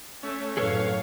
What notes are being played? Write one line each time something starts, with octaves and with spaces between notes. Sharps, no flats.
A3 C#4
F#2 A2 G#4 A4 B4 C#5 F5